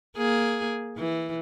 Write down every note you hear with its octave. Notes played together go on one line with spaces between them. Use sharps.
A#3 G#4
E3